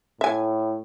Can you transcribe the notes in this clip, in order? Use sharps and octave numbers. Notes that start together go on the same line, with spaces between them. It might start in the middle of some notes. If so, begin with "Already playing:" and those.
A2 E5 G#5